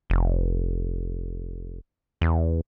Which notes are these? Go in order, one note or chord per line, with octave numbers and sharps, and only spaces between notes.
F1
E2